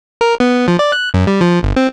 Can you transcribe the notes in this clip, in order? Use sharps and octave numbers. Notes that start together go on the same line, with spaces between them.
A#4
B3
F3
D5
F#6
F#2
G3
F3
G1
C4